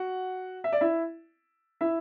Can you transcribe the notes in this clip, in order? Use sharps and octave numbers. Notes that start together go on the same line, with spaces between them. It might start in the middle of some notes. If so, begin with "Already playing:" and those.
Already playing: F#4 F#5
E5
D5
E4 E5
E4 E5